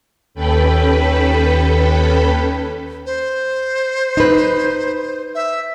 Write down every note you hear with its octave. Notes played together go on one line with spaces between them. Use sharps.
D#2 C#4 A4 B4 G5 B5
C5
D#4 B4
E5